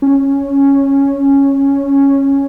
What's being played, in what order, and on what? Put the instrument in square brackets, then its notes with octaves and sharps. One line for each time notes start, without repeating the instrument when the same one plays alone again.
[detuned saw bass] C#4